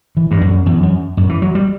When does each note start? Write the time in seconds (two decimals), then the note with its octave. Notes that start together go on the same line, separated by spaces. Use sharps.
0.17 E3
0.31 G2
0.41 F#2
0.66 E2
0.83 F#2
1.17 F#2
1.29 E3
1.42 F#3
1.55 G3